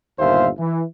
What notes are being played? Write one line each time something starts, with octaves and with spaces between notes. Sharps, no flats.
G1 D#2 A#2 C5 E5 F5
E3